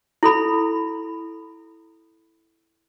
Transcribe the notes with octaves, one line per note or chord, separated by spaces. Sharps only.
E4 A4 B5